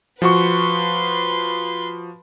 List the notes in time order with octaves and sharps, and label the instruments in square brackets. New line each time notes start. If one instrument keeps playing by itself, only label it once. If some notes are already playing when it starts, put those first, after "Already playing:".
[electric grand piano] F3 F#4 C#6 [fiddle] B4 C6